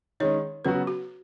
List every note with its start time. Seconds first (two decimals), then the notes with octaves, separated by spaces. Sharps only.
0.20 D#3 G#3 C#4 C#5
0.65 C#3 F#3 B3 F#4 B4
0.87 F#4